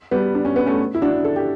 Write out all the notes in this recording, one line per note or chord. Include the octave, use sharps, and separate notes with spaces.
G3 B3
D4
C#4
B3
A3 C#4
E4
D4 F#4
A4
G4